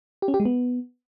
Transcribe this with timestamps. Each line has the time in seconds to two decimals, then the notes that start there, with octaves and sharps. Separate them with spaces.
0.22 G4
0.28 C#4
0.34 G4
0.40 G#3
0.45 B3